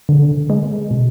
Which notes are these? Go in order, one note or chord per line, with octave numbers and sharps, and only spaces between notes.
D3
G#3
B2